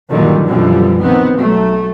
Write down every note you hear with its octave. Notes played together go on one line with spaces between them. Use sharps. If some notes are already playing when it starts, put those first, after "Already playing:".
G2 A#2 D3 D#3 F#3 G3
F#2 B2 D3 E3 F3 G3
A#1 D#3 B3 C4
B1 F#3 A3